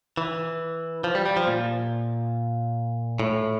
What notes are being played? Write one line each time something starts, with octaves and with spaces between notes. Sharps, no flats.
E3
F3
G3
G3
F3
A#2
A2